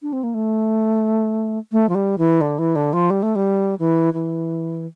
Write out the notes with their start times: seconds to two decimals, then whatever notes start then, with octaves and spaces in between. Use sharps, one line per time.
0.02 D4
0.13 C4
0.23 A#3
0.34 A3
1.72 A3
1.89 F3
1.95 G3
2.18 E3
2.41 D3
2.59 E3
2.76 D3
2.93 F3
3.10 G3
3.23 A3
3.35 G3
3.79 E3
4.13 E3